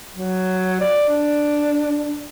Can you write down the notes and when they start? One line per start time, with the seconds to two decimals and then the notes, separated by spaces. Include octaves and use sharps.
0.15 F#3
0.80 D5
1.09 D4